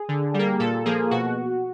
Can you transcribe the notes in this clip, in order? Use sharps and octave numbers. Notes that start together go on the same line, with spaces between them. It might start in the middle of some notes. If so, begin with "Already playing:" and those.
Already playing: G#4
D3
G3 A#3
A#2 A4
F3 A#3 G#4
B2 F#4